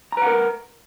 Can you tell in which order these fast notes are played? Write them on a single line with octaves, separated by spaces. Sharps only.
A#5 B4 F#5 A#4